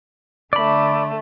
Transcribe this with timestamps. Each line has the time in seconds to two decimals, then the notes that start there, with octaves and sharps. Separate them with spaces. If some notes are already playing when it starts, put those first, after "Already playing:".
0.53 D3 A3 D5 B5